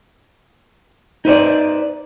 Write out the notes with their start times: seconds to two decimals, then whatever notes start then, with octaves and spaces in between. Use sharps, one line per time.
1.25 D#4 B4 C5 D5